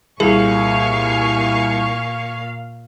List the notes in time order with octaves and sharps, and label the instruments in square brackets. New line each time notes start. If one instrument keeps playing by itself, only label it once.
[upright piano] C2 [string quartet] A#2 F5 [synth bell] G#4 [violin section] G#5 C#6